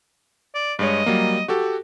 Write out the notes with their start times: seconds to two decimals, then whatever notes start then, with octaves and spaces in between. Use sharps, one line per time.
0.55 D5
0.79 G2 G#3 C#5 D#5
1.06 F#3 G3 A#3
1.48 F#4 G4 A4